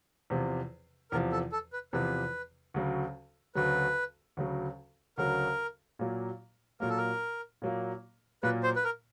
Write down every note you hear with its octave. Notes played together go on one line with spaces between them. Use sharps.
E2 C3 F3
E2 C3 F3 A#4
A4
A4
B4
E2 C3 F3 B4
D2 C#3 F#3
D2 C#3 F#3 B4
D2 C#3 F#3
D2 C#3 F#3 A#4
A#2 F#3 A#3
A#2 F#3 A#3 A#4
A4
A#4
A#2 F#3 A#3
A#2 F#3 A#3 B4
C5
B4
A#4